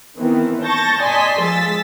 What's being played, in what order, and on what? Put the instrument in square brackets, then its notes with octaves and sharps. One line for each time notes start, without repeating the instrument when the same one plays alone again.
[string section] D#3 E3 B3 C4
A5 C#6 G6 A6 A#6
D5 D#5 G#5 A5 C6 B6
F3 G#3 E6 A6 B6